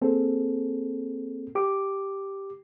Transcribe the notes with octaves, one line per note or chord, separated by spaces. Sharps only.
A#3 C4 G#4 A4
G4 D6